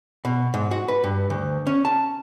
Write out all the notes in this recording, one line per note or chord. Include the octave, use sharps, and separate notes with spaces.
B2
G#2
F#4
B4
G2
D2
C#4
A5